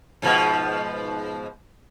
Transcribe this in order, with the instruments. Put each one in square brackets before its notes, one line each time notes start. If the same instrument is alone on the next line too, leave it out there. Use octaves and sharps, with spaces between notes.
[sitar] G#2 B2 F3